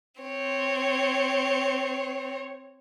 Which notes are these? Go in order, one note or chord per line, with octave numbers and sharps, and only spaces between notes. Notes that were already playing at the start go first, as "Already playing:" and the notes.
C4 C#5